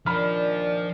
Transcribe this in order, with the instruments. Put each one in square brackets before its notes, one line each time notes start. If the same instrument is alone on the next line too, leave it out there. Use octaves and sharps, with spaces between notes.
[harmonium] A#2 D#3 D4 [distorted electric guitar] F3 [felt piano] B5 F6